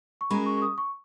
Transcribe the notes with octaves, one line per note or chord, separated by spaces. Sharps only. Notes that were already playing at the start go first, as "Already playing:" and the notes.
C#6
G#3 C#4 F#4 A#4 B5
C#6
C#6
D#6
C#6